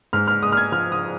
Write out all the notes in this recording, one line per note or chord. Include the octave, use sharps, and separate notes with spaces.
G#2 F6
F6
G#3 D#6
F6
G#6
F3 F6
D#6